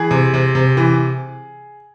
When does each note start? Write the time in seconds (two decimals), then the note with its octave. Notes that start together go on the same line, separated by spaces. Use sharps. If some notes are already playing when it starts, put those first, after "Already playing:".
Already playing: E3 G#4
0.11 C3
0.34 C3
0.55 C3
0.77 E3